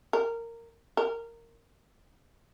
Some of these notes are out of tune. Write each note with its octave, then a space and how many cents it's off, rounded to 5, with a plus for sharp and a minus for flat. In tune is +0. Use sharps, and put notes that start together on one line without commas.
A#4 -15
A#4 -15